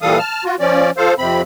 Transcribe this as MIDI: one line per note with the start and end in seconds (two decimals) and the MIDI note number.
0.02 0.18 46
0.02 0.18 52
0.02 0.18 55
0.02 0.18 69
0.02 0.18 77
0.02 0.18 87
0.18 0.44 81
0.18 0.44 89
0.45 0.56 65
0.45 0.56 66
0.60 0.90 53
0.60 0.90 61
0.60 0.90 74
0.97 1.14 53
0.97 1.14 69
0.97 1.14 72
0.97 1.14 77
1.18 1.42 41
1.18 1.42 48
1.18 1.42 60
1.18 1.42 83